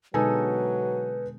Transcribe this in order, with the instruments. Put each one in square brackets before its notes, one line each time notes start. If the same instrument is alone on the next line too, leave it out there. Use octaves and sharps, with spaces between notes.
[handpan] B2 D3 G#3 [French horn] F#3 [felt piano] D#4 A4 G#5 [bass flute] B4